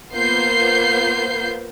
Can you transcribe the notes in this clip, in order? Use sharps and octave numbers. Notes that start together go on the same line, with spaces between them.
A#3 B3 F4 C5 G6 C7